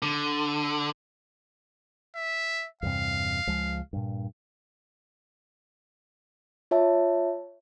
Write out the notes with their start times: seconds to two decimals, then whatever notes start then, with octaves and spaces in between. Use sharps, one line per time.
0.03 D3
2.16 E5
2.83 E2 G2 C3 F5
3.47 C#2 F3 G#3
3.93 G2 A#2
6.71 F4 C#5 E5 A5